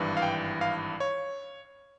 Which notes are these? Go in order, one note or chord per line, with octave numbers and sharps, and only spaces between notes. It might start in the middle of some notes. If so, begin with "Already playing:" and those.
Already playing: G#1 G2 E3
F5
G5
F5
C#5